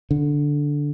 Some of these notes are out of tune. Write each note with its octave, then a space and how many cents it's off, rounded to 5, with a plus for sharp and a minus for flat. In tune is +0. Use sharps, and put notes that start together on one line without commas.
D3 -5